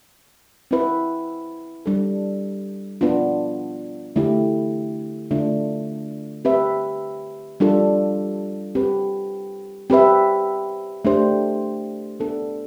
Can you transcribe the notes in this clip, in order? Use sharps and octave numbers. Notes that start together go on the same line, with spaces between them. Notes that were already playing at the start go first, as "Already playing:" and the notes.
C4 E4 B4 E5
G3 D4 A4
B3 D4 F4
D3 A3 E4 G4
D3 A3 D4 F4
C4 G4 B4 E5
G3 D4 F4 A4
C4 G4 B4
C4 G4 B4 E5
A3 D4 G4 C5
B3 D4 A4